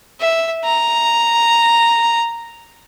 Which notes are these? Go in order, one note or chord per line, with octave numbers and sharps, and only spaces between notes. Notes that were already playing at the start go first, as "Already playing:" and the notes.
E5
A#5